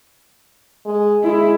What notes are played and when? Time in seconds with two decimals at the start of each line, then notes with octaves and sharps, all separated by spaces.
0.85 G#3
1.24 G#3 E4